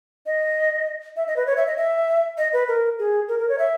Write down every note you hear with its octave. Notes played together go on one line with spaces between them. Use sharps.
D#5
E5
D#5
B4
C#5
E5
D#5
E5
D#5
B4
A#4
G#4
A#4
A#4
C#5
E5